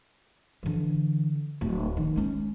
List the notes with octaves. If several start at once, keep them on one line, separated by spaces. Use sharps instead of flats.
D3 E3
D1
D#3
G#3 C#4